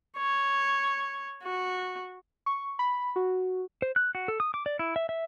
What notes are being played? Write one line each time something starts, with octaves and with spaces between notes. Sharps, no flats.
C#5
F#4
C#6
B5
F#4
C5
F#6
F#4
A4
D#6
D6
D5
E4
E5
E5